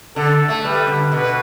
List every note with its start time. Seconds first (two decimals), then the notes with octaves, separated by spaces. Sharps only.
0.16 D3 A4
0.48 A3
0.64 G3 B4
0.87 D3
1.12 B2 B4